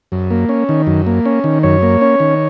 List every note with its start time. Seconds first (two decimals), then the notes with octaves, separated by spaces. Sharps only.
0.12 F#2
0.31 A#3
0.49 C#4
0.69 D#3
0.87 F#2
1.06 A#3
1.26 C#4
1.44 D#3
1.63 F#2 C#5
1.82 A#3
2.01 C#4
2.20 D#3